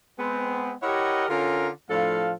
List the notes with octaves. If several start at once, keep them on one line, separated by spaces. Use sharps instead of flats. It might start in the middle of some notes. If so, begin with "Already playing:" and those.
G#3 B3 C4
E4 G4 A#4 C#5 D#5 F#5
D3 C#4 F4 A4 A#4
A2 F3 D4 A4 F5